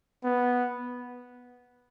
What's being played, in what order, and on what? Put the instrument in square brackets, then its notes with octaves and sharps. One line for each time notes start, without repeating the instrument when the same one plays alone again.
[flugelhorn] B3